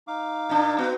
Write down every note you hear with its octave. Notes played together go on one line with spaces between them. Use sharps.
D#4 F5 D6
A#2 D4
B3 F#4